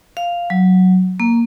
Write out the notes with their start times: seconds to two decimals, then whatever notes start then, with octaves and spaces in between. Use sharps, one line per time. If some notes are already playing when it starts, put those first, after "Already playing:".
0.17 F5
0.50 F#3
1.20 A#3